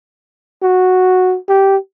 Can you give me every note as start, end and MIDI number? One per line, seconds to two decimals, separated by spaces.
0.63 1.36 66
1.49 1.76 67